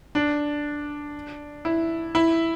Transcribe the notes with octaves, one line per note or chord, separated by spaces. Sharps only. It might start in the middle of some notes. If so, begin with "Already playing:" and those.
D4
E4
E4